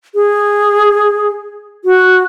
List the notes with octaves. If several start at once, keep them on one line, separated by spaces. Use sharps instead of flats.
G#4
F#4